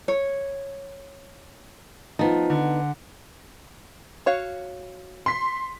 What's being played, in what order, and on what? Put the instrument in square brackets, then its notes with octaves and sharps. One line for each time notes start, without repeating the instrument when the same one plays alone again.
[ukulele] C#5
[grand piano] F3 [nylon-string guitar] B3 D#4
[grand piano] D3
[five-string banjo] F#4 C#5 F5
[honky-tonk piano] C6 B6